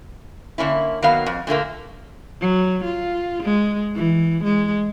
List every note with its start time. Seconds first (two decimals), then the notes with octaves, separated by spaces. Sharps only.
0.58 D3 A#3 C#4 E4
1.02 D#3 F#3 A#3 B3 F5
1.26 F2
1.47 A#2 D3 A3 A#3
2.41 F#3
2.84 F4
3.43 G#3
3.95 E3
4.44 G#3